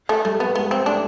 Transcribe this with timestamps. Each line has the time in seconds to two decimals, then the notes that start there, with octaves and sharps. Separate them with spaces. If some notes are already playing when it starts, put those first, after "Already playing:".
0.09 A3
0.25 G3 A3
0.40 B3
0.55 G#3 B3
0.71 C4
0.86 A3 D4